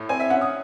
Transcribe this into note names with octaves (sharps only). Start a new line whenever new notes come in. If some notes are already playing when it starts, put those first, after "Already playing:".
Already playing: A2
C4 G#5
E5
C#4 F#5
D#6